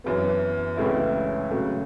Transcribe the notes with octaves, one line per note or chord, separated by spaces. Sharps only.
F#2 E3 B3
C#2 C#3 E3 A3 E4
C#3 F#3 A3